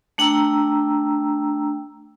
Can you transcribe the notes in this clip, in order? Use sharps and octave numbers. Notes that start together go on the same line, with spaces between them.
A3 D4 G5 A#5 E6